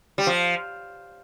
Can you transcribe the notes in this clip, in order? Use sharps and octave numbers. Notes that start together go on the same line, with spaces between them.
G3
F3